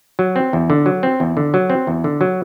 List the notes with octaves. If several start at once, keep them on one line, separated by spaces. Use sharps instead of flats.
F#3
C4
E2
D3
F#3
C4
E2
D3
F#3
C4
E2
D3
F#3